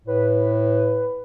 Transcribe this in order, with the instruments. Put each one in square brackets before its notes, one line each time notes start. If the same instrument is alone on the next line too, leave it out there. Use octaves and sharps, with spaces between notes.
[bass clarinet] A2 [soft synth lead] B4